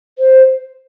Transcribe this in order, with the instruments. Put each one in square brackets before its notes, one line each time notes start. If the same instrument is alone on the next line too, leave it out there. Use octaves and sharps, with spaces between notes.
[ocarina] C5